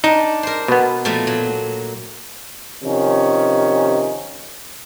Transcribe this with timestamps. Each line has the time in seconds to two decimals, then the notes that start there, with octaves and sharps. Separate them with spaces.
0.04 D4 D#4
0.43 A#4 C5
0.68 B2 B3
1.05 A#2 F3 A3
1.27 F#3
2.84 C3 D#3 F3 C#4